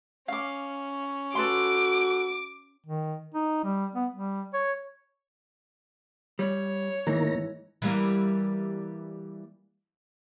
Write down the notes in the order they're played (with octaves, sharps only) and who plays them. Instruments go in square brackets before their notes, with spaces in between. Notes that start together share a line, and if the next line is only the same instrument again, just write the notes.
[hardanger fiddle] C#4 [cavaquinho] F5 D6
[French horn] F#4 [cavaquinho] A4 B4 C6 [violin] D6
[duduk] D#3
D#4
G3
B3
G3
C#5
[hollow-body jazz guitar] G3 [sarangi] C#5
[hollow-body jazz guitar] G#2 E3 [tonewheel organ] D#3 A#3 A#5
[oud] E3 G3 A#3